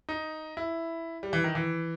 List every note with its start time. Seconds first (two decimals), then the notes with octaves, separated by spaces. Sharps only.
0.09 D#4
0.57 E4
1.23 G3
1.33 E3
1.44 D#3
1.55 E3